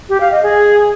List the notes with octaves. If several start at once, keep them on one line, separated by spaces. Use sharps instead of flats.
G4
F5
D#5
G#4